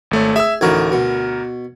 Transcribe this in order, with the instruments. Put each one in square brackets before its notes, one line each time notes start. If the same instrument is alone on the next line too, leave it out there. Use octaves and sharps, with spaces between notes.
[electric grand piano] G#1 A3 C#5
[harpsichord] G#4 [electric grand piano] E5 E6
[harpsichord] A1 D#4 F#4 [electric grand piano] D2 A#4 G#6
[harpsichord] B2